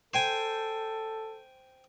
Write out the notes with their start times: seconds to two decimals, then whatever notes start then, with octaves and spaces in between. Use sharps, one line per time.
0.14 A4 C5 G5 G#5